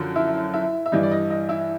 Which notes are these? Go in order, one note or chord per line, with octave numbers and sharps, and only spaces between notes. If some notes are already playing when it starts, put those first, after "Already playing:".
Already playing: F#2 D3 F3
E4 E5
E4 E5
E5
G2 E3 G3 D#5
D5
D#5
D#5
E4 E5